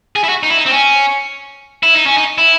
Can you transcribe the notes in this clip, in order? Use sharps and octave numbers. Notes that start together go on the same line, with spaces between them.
G#4
E4
F#4
D#4
E4
D#4
C4
C#4
E4
D#4
C#4
D#4
E4